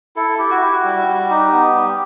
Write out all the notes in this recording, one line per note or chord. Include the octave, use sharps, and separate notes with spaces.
E4 A4
E4 G4
F#4
E4 G4
F#4
G3
G3
D#4 G4
B3
G3